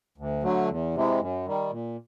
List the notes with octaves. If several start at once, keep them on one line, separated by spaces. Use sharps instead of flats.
D2
D3 F#3 A3
E2
C3 E3 G#3
F#2
D#3 G3
A#2